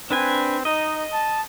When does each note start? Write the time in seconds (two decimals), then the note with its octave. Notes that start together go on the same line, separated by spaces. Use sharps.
0.11 C4 D4 B4 G#5
0.65 D#4 D#5
1.13 A5